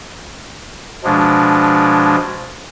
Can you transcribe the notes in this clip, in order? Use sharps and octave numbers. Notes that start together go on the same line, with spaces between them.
B2 F3 G#3 D4